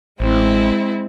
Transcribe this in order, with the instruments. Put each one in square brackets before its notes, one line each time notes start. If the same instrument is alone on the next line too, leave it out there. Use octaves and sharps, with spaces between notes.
[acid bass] A1 [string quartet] G#3 C4 E4